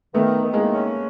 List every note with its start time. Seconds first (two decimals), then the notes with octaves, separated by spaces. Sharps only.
0.14 D#3 A3 B3
0.44 D#3
0.53 G#3 A#3
0.73 C#4